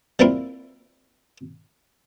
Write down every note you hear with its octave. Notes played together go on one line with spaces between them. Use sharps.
G3 A#3 C4 E4 F4 A#4